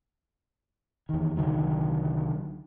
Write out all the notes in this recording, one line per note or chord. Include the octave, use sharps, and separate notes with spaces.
E2 D#3
C2 D3 D#3 F#3